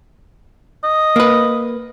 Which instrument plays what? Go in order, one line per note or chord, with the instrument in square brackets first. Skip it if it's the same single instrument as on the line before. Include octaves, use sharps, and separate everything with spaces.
[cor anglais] D#5
[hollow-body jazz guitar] A#3 B4